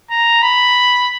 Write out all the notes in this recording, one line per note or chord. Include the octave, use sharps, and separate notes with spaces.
A#5
B5